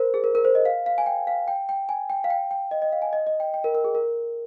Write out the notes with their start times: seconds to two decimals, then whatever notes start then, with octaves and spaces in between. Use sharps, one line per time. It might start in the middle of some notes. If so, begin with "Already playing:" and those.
Already playing: A#4 C5
0.14 G#4
0.24 A#4
0.35 A#4
0.45 C5
0.55 D#5
0.65 F5
0.86 F5
0.98 G#5
1.06 G5
1.27 F5
1.48 G5
1.69 G5
1.89 G#5
2.10 G5
2.24 F5
2.30 G5
2.51 G5
2.71 D#5
2.82 D#5
2.92 F5
3.02 G#5
3.13 D#5
3.27 D#5
3.40 G5
3.54 G5
3.64 A#4
3.75 A#4
3.84 G#4
3.95 A#4